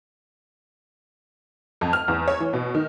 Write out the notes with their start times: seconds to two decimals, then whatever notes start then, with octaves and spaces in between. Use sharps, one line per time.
1.81 F2
1.93 F6
2.08 E2
2.28 C#5
2.40 E3
2.53 B2
2.75 D#3